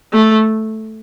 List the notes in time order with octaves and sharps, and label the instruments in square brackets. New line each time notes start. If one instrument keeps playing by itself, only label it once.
[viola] A3